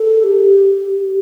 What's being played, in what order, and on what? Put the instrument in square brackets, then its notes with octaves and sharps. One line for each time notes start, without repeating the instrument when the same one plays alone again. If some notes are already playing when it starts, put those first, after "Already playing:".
Already playing: [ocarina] A4
G4